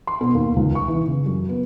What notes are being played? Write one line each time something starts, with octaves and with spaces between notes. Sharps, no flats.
C6
B2
D#2
C#2
C#6
E3
C#3
F#2
B3